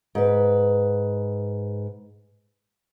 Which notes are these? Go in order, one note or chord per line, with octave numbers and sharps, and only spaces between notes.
G#2 B4